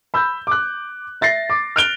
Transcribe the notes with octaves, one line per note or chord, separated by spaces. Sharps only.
B5 E6 G6
D6 F#6
E5 A6 A#6 C7
D6
F6 F#6 D7 F7 G7